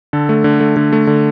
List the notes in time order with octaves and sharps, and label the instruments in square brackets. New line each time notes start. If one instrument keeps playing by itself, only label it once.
[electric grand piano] D3 A4
A3
D3
A3
D3
A3
D3